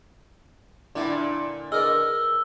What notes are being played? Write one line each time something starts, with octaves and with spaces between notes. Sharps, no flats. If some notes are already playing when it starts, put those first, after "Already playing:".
A#2 D3 D4 E4 D5
G#4 A#4 B4 D5 D#5 E6 F6